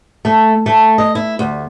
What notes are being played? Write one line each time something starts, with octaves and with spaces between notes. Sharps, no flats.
A3
A3
D#5
E4
D2